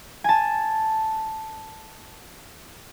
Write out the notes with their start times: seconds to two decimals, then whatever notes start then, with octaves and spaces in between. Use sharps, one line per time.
0.24 G#5 A5